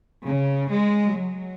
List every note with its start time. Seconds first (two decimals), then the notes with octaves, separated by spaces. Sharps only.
0.25 C#3
0.70 G#3
1.15 F#3